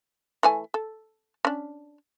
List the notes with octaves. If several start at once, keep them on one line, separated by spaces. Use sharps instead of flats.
E3 A3 G#5
A4
C#4 D4